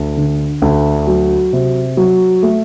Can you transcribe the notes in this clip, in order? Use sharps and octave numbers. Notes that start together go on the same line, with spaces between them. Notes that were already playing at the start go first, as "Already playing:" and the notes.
Already playing: D2
D3
D2
F#3
C3
F#3
A3